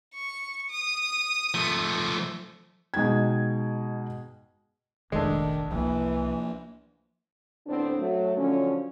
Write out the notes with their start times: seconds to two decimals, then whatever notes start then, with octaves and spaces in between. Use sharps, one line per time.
0.15 C#6
0.70 D#6
1.54 F3 A3
2.94 B2 G#3 D#4 G5 G#6
5.12 F1 A#1 D#3 G#3 A3 D4
5.71 C2 E3 F3 A#3
7.66 D2 A2 B3 C4 D4
7.98 F#3 A3
8.37 D3 F3 F#3 C#4